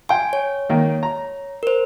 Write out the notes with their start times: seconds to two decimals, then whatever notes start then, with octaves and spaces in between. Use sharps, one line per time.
0.09 G5 G#5 C6
0.33 C#5
0.69 D#3 A#3
1.03 A#5
1.63 A#4 C5